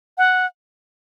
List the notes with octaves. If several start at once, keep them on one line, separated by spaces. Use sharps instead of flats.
F#5